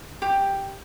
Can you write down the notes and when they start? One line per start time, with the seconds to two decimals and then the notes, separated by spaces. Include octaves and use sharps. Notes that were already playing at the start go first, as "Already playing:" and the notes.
0.22 G4